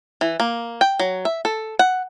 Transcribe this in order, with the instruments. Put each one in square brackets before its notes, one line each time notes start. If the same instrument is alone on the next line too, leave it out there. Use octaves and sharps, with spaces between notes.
[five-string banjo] E3
A#3
G5
F#3
E5
A4
F#5